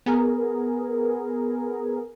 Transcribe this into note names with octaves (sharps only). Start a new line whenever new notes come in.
B3 G#4 A#4